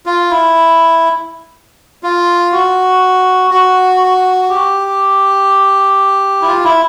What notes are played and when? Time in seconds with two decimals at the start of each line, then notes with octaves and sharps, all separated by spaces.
0.06 F4
0.31 E4
2.03 F4
2.52 F#4
3.51 F#4
4.50 G4
6.42 E4
6.47 F4
6.64 E4